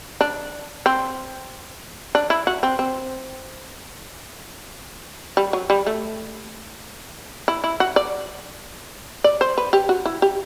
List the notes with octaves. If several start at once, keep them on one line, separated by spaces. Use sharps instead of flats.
D4
C4
D4
E4
F#4
C4
C4
G3
F#3
G3
A3
E4
E4
F#4
D5
D5
C5
B4
G4
F#4
E4
G4